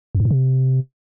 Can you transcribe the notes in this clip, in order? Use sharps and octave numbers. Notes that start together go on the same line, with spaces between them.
F2
G2
G#2
C3